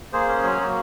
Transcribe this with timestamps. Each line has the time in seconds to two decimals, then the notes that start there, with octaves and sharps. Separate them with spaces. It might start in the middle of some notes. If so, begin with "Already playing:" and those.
0.13 A#3 G#4 C5
0.28 C#4
0.44 F#3
0.60 A#3